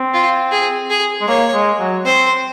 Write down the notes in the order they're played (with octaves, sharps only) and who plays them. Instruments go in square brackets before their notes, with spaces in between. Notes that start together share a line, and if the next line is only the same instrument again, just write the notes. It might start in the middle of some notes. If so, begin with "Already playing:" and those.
Already playing: [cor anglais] C4
[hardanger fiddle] F4
G#4
G#4
[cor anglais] G#3
[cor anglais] A#3 [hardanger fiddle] C#5
[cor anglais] G#3
F#3
[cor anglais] C4 [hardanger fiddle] C5